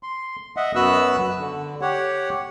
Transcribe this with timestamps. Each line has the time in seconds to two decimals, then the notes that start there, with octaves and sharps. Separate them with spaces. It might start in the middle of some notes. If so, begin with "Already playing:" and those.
0.03 C6
0.57 D#5 E5 F#5
0.75 F#2 B3 F#4 B4 E6 F#6
1.39 D3
1.81 G4 C#5 F#5